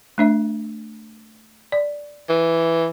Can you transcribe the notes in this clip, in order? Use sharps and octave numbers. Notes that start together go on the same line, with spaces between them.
A3 D4 E5
D5
E3